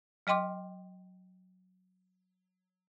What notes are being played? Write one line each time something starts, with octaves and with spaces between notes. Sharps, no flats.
F#3 D#5 G5 C6 D6